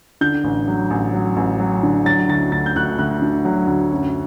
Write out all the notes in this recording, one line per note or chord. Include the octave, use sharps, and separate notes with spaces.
D3 G6
A1
F#3
A1
F#3
A1
F#3
D3
F#3 A6
D2 A6
D2 A6
G6
D2 F#6
D2 F#6
D3
F#3
D2
F#2